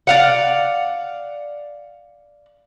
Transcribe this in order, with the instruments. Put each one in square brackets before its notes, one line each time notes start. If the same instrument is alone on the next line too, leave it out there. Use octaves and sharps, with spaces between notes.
[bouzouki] D5 F5 F#5